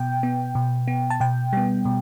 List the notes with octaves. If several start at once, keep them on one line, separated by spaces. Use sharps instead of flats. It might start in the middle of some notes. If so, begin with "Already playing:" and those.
Already playing: B2 G5
B3
B2
B3
A5
B2 G5
G3 B3
B2